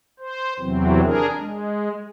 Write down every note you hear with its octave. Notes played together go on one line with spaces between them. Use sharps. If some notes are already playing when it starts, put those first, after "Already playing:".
C5
E2 C3 E3 F#3 C4
D4 G#4 A#4
G#3